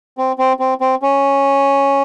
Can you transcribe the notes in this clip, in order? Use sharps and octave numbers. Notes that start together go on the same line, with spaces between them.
C4
C4
C4
C4
C#4